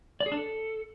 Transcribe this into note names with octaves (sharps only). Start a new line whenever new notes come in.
D5
G#4
D4
A4